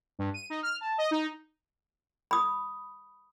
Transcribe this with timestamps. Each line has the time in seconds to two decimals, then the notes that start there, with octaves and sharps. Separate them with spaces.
0.19 G2
0.34 D#7
0.50 D#4
0.63 F6
0.81 A5
0.98 D#5
1.11 D#4
2.31 B5 D#6